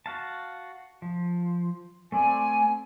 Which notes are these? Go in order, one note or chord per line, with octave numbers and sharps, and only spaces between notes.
F#4 F5 A5
F3
A3 C4 D5 G#5